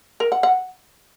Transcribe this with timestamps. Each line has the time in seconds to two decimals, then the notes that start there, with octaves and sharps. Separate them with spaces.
0.20 A#4
0.32 F#5
0.43 F#5